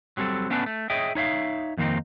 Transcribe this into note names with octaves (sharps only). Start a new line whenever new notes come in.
F#3 G3 C4 G#4 A4
A3 B3 C#4 D4 A4 B4
A3
G#4 C#5 D#5 E5 G5
D#4 C#5 E5 F5
F2 D#3 A#3 C4 D#4